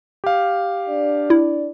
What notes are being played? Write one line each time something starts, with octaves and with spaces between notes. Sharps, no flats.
G4 F5
D4 D5
E4